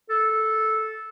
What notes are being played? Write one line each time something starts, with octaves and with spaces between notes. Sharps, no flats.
A4